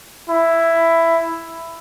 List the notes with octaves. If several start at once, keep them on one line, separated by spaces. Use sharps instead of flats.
E4